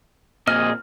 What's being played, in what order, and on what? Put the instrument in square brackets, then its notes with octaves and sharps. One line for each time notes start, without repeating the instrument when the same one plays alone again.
[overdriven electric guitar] A#2 C4 [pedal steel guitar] G#4 D#5 [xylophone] F6